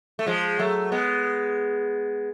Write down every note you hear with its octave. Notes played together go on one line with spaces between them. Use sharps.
A3
F3 G#3
F#3 A3
G#3 B3